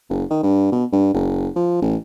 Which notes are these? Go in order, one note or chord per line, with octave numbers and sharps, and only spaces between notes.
F#1
D#3
G2
B2
G2
F#1
F3
A1